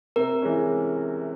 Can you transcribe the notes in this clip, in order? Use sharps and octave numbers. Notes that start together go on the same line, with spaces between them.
C3 A#4
E3 G#3 C#4